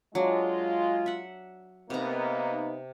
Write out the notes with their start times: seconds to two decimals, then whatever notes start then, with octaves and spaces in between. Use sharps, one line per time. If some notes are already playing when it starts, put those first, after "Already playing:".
0.15 F#3 G#3 D4 F4
1.06 E5 F#5
1.90 C3 A#3 B3 D#4 A#5